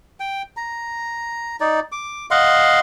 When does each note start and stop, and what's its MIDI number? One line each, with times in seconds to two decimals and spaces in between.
0.20 0.42 79
0.57 1.56 82
1.60 1.80 63
1.60 1.80 74
1.92 2.26 86
2.31 2.80 75
2.31 2.80 77
2.31 2.80 78
2.31 2.80 84